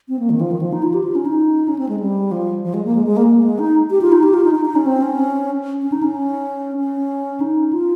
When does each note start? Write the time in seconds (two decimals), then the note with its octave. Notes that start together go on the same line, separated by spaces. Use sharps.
0.09 C4
0.19 A#3
0.30 D#3
0.41 F3
0.51 D#3
0.61 F3
0.73 D#4
0.83 F4
0.94 G4
1.04 F4
1.15 C#4
1.26 D#4
1.68 C#4
1.79 C4
1.89 G#3
2.00 G3
2.32 F3
2.63 F3
2.74 G#3
2.85 A#3
2.95 G#3
3.06 G#3
3.17 A#3
3.27 A#3
3.43 G#3
3.59 D#4
3.91 G4
4.01 F4
4.12 D#4
4.23 G4
4.34 F4
4.44 D#4
4.55 D#4
4.65 D#4
4.75 C#4
4.86 C4
5.02 C#4
5.82 C#4
5.92 D#4
6.03 C#4
6.77 C#4
7.41 D#4
7.73 F4